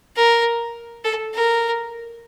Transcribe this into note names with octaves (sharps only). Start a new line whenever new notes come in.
A#4
A4
A#4